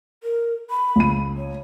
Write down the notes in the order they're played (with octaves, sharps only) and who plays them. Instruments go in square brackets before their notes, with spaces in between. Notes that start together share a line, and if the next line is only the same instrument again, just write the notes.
[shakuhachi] A#4
B5
[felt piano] C#2 D#7
[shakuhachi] C#5